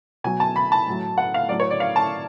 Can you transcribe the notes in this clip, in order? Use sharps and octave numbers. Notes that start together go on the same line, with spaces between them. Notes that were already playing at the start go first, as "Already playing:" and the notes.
B2 F#3 G#5
A5
B5
A5
A2 F#3
F#5
F5
A2 F#3 D5
C#5
D5
F5
A5